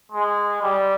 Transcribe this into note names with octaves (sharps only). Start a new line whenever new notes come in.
G#3
G3